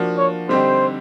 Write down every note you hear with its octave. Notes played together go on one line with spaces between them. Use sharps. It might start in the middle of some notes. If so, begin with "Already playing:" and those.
Already playing: F3 A#3 D4 F#4
C#5
D3 G3 C4 D#4 G4 C5